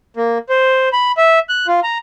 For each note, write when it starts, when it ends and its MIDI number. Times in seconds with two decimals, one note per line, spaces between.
0.17 0.38 58
0.49 0.89 72
0.93 1.12 83
1.17 1.39 76
1.49 1.67 90
1.67 1.80 65
1.83 1.98 82